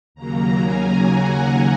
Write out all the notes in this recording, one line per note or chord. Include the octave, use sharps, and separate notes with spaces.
D#2 C#3 F#3 A#3 A#5
G#5
F#5
F#5